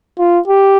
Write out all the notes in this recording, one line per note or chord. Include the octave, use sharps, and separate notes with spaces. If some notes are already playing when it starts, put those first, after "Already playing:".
F4
G4